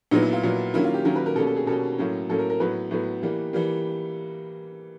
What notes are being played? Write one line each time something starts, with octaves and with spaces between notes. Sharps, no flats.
A#2 F#3 B3 D#4
E4
F4
A#2 F#3 B3
D#3 F#3 A#3 C#4 E4
F4
G4
D#3 F#3 A#3 C#4 A#4
B4
A#4
B2 G3 A#3 C#4 A4
A4
G#4
B2 G3 A#3 C#4 A4
A2 F#3 A#3 C#4
A2 F#3 A#3 C#4 A4
A#4
A#4
A2 F#3 B3 B4
A2 F#3 B3
E3 G3 A#3
E3 G3 A#3